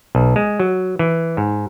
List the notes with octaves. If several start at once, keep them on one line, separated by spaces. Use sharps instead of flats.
B1
G#3
F#3
E3
G#2